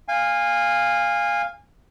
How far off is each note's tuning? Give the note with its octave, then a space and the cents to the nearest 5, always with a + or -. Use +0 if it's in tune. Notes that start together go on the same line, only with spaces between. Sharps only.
F5 +0 G#5 -25